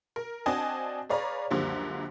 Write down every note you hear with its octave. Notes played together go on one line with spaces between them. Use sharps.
A#4
C4 D4 F#4 D#5 G#5 A5
G#4 B4 C#5 D5 F5 A#5
C#2 F#2 D3 F3 G3 A#3